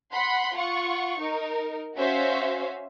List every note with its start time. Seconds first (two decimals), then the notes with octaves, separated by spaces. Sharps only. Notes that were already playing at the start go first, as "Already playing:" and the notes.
0.12 F#5 B5 C6
0.56 F4 F#5 C#6
1.20 D#4 A#4
1.97 C#4 F#4 C5 E5 F5